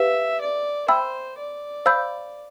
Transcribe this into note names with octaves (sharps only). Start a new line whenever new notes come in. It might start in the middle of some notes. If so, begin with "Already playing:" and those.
Already playing: G4 B4 E5 F5
D5
C5 E5 G5 B5 E6
D5
C5 F5 B5 E6 G6